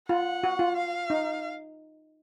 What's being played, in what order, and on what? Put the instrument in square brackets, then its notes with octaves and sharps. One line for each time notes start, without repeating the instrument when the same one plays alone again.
[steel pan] F4 [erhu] F#5
[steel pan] F#4
F4
[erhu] F5
[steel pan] D#4